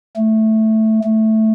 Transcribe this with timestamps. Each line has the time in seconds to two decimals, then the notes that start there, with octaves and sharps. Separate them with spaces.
0.16 A3
1.04 A3